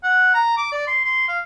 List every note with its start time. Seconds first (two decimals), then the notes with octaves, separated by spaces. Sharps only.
0.03 F#5
0.34 A#5
0.57 D6
0.72 D5
0.87 C6
1.04 C6
1.28 F5